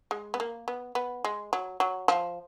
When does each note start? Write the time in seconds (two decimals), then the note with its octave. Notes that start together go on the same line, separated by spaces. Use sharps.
0.11 G#3
0.34 B3
0.40 A#3
0.68 B3
0.95 B3
1.24 G#3
1.53 F#3
1.80 F#3
2.08 F3